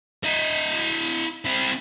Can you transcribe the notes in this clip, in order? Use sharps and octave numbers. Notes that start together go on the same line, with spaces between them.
E4 D#5
C4 E4